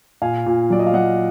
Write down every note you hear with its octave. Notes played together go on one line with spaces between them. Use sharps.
A#2 F5 G#5
A#2
F#3 D5
D#5
F5
F#3 D#5 F#5